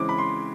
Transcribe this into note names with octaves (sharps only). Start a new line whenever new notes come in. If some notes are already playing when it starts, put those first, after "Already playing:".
Already playing: C#3 E3 G#3 C4 D6
B5
C6